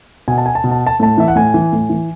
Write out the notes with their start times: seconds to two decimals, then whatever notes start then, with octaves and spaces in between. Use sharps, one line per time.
0.28 B2 G#5
0.38 A5
0.46 G#5
0.55 A5
0.64 B2
0.71 A5
0.87 A5
1.00 A2 A5
1.18 E3 E5
1.28 F#5
1.36 A2 G#5
1.54 E3
1.72 A2
1.90 E3